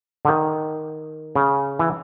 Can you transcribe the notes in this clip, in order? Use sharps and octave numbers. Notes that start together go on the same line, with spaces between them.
D3
D#3
C#3
E3